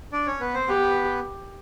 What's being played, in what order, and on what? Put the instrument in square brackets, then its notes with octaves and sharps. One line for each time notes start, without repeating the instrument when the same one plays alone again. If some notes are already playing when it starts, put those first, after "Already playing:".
[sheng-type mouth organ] D4 D5
C#4 C#5
B3 B4
C4 C5
[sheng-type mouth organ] B3 B4 [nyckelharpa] G4